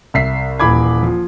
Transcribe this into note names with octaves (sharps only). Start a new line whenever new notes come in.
C2 E5 B6 C7
D#1 E3 B5 D6 G#6
F3